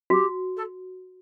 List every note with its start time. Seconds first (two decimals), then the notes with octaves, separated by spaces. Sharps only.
0.10 F#4 G4
0.56 A4